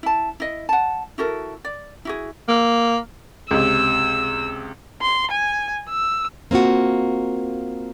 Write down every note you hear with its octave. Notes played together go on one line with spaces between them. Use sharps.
E4 A5
E4 D#5
F#5 A5
E4 F#4 A4 A#4
D5
E4 F#4 G#4
A#3
C#2 C3 E6
C6
G#5
E6
A#3 C4 F4 F#4